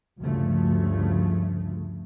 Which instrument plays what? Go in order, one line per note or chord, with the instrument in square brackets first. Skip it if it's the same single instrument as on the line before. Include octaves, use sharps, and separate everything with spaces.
[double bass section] D2 G2 C#3 F3 A3